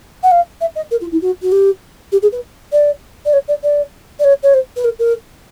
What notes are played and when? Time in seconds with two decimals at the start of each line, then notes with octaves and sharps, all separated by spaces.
0.23 F#5
0.31 F5
0.61 E5
0.76 D#5
0.91 A#4
1.01 F4
1.12 E4
1.22 F#4
1.42 F#4
1.52 G4
2.12 G4
2.22 G#4
2.32 B4
2.72 D5
3.25 D5
3.33 C#5
3.48 D5
3.63 D5
4.19 D5
4.24 C#5
4.43 C#5
4.54 C5
4.76 B4
4.84 A#4
4.99 A#4